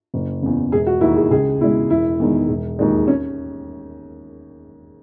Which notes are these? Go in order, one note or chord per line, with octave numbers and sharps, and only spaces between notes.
F#1
E2 C#3
E1 G#4
F#4
D#2 D#3 E4
G#4
C#2 G#4
B2 G#3 E4
E1 E4
E2 D#3 G#3
E1
D#2 D#3 G#3
C#4